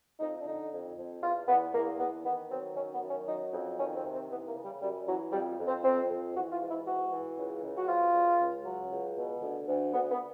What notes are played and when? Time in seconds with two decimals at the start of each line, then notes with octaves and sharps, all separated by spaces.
0.20 F2 D#4
0.41 D4
0.46 D3 D#4
0.72 F2
0.97 F2
1.22 E2 F4
1.48 E2 B3
1.74 E2 A#3
1.99 E2 B3
2.25 D#3 B3
2.51 F#3 C4
2.76 D#3 C#4
2.94 B3
3.02 F#2
3.11 C#4
3.28 F#3 D#4
3.53 F2
3.79 D#3 C#4
3.96 C4
4.04 C3
4.13 C4
4.30 E3 B3
4.47 A#3
4.56 C#3
4.64 G3
4.81 F#2 G3
5.06 E3 F#3
5.32 F2 G3
5.58 F2
5.67 C4
5.84 F2 C4
6.09 F2
6.35 E3 F#4
6.52 F4
6.61 G#2
6.69 E4
6.86 E3 F#4
7.12 E3
7.37 C#2
7.63 C#2
7.77 F#4
7.89 F3 F4
8.14 C#2
8.40 C#2
8.65 F#3
8.91 C#2
9.17 B2
9.42 D2
9.67 D2
9.94 D2 B3
10.11 B3